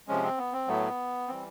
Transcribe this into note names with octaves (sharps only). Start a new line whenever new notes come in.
C3 F3 G#3 C#4
C4
B3
C4
A2 F#3 A3 B3
E3 G3 C4